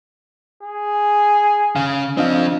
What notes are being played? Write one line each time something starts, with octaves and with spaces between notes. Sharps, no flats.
G#4
C#3 F5
F3 C4 D4 D#5 F5